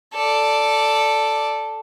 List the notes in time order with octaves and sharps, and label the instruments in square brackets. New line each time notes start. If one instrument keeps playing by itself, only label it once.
[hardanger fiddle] A4 D5